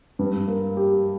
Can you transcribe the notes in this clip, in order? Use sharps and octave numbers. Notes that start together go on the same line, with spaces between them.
G2
A#3
G4